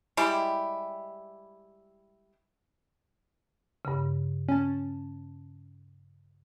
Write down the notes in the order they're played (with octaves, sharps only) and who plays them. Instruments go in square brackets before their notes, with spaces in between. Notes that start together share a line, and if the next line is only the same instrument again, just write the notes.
[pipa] G3 G#3 E4 G4
[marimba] G2 C#3
[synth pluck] C#4 A5